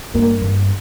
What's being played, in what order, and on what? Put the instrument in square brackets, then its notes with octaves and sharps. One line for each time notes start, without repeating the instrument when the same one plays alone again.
[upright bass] G2 [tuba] A#3
[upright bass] G2